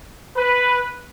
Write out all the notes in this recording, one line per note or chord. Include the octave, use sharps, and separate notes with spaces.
B4